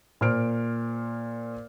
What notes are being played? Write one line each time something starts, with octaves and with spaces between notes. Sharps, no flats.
A#2 C5 F6 D7